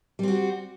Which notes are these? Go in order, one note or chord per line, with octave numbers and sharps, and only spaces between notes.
G3 C4 F#4